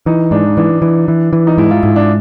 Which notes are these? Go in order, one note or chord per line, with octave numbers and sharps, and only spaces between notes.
E3 D#4
G#2 D4
E3 D4
E3
E3
E3
D#4
G#2 E4
F4
G#2 E4
D4